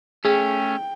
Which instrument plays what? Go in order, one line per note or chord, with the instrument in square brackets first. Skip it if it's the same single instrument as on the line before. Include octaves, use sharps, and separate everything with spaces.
[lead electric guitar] A3 C#4 [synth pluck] G#4 [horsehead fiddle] G5